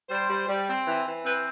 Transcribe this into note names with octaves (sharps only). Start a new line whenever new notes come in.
G3 C5
G3
G3
C4
E3
E3
C4 B4